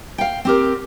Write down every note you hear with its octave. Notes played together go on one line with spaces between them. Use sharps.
F5 G5
C4 G4 A#4